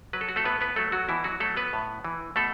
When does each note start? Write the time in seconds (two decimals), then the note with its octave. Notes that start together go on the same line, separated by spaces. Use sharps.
0.13 F#3 B4
0.21 A4
0.29 F#4
0.36 A3 A4
0.44 A2 B3 B4
0.61 B3 B4
0.76 F#3 A3 A4
0.92 F#3 F#4
1.09 B2 E3 E4
1.24 F#3 F#4
1.40 F#3 A3 A4
1.57 B3 B4
1.73 A2
2.04 E3
2.36 B2 A3 A4